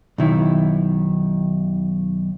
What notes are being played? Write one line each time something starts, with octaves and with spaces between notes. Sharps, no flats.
B1 D#3 E4